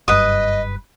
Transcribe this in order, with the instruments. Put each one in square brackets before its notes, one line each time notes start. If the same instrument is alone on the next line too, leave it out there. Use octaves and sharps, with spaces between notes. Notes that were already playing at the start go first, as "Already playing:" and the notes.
[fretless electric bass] F#1 G2 [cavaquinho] B4 D#6 [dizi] D#5